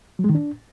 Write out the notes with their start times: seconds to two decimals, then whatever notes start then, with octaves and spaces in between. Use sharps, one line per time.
0.19 F#3
0.24 G#3
0.29 D#3
0.35 D4